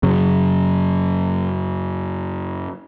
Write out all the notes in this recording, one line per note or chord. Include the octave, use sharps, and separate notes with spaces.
F#2 C#3